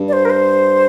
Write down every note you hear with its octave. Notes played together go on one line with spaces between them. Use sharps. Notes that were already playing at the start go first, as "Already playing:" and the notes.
Already playing: G2
D5
C5
A#4
C5